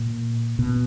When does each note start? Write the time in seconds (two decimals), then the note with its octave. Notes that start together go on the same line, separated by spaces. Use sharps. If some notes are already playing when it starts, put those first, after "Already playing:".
Already playing: A#2
0.59 B2